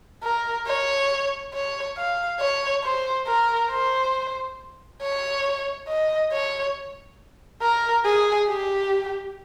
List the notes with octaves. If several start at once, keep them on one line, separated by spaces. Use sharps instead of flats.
A#4
C#5
C#5
F5
C#5
C5
A#4
C5
C#5
D#5
C#5
A#4
G#4
G4